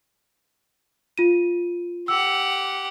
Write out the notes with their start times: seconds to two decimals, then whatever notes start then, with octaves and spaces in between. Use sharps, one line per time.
1.18 F4 D#7
2.08 G4 F#5 E6